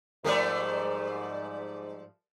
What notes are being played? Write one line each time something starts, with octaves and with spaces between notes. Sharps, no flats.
G#2 F3 G3 A3 A#4 D5